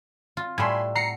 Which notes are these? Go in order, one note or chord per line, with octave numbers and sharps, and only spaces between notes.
F4
A2 G3 A3 G#5 B5 C6
F#5 A#5 C7 C#7